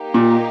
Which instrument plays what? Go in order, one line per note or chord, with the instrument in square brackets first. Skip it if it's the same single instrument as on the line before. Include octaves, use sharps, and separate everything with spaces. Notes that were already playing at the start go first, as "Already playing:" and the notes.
Already playing: [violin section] A#3 D#4 G4
[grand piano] A#2